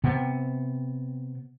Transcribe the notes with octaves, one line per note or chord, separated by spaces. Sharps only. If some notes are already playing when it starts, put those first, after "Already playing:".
C3 B3